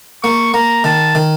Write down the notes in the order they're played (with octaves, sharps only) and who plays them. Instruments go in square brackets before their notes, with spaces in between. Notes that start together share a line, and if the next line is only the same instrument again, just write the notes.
[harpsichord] A#3 [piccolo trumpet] C#6
[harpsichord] A#3 [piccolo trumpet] A#5
[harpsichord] D#3 [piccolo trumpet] A5
[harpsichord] D#3